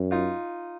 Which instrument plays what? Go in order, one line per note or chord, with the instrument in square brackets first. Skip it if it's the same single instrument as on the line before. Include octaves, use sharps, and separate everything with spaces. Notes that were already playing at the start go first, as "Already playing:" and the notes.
Already playing: [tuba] F#2
[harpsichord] D#4 F4